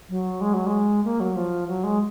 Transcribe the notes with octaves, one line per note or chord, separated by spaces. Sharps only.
F#3
G#3
F#3
G#3
A#3
F#3
F3
F#3
G#3